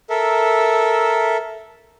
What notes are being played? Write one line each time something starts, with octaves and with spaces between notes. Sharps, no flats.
A4 A#4 E5